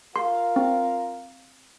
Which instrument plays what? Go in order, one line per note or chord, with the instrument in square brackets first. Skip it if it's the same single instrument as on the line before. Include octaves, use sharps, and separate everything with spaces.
[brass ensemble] F4 A#4 F5 [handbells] C6
[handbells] C4